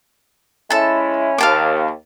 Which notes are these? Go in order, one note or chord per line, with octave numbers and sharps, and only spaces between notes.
G#3 C#4 E4 A4 A5
D#2 F5 A5 D6